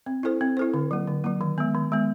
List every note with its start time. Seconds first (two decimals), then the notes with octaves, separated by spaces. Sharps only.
0.06 C4
0.23 E4 A4 C5
0.41 C4
0.57 E4 A4 C5
0.74 D3
0.91 F#3 A#3
1.07 D3
1.24 F#3 A#3
1.41 D#3
1.58 G#3 B3
1.75 D#3
1.92 G#3 B3